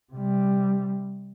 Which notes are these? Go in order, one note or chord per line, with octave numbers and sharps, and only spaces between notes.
C3 G3